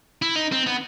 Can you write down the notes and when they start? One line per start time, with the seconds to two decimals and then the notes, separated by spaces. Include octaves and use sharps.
0.22 E4
0.36 D#4
0.52 C4
0.66 B3